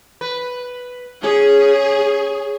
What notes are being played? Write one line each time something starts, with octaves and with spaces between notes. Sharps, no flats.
B4
C#4 G#4